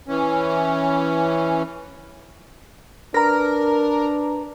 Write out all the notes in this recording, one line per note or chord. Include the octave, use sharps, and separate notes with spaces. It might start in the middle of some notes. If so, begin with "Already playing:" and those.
E3 C#4
D4 A#4 B4 A#5